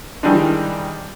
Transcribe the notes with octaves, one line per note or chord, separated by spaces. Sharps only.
D#3 E3 G3 G#3 D4 D#4